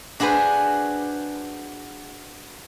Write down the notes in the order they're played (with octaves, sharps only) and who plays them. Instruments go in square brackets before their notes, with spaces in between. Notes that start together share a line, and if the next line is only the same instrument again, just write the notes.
[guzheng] D4 F#4 G#4 B4 C5